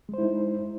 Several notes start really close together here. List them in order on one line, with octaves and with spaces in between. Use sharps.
G#3 C5 E4 D#4